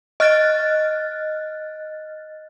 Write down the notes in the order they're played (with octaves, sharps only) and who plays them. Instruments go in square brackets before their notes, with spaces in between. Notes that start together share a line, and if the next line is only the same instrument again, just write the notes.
[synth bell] D#5 F6 F#6 A6